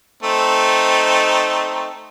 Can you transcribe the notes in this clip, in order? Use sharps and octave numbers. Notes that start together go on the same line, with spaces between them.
A3 C4 D#4